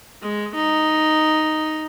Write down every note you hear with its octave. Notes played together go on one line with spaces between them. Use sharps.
G#3
D#4